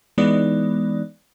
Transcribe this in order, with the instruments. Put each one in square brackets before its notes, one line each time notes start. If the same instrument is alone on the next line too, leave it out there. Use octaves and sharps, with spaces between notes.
[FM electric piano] E3 G#3 B3 D#4 D5